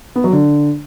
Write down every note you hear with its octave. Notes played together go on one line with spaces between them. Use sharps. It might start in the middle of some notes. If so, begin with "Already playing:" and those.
B3
F#3
D3